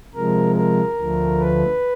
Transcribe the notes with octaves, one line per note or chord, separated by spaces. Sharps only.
C3 F3 G#3 A#4
A#4
D2 D3 F3 A3
B4